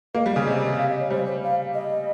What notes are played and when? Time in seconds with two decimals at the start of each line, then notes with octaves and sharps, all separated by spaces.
0.15 A#3 D#5
0.26 G3
0.36 C#3
0.47 C3
0.78 F5
0.89 D#5
1.00 C#5
1.10 G3 C5
1.26 C5
1.43 F5
1.74 D#5